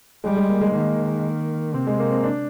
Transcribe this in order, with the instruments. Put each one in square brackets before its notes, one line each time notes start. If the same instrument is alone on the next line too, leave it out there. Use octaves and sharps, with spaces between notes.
[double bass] G3 [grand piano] G#3
[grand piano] G#3
A#3
G#3
[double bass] D#3 [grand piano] A#3
[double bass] C3 [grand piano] C4
[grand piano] G#3
A#3
C4
D4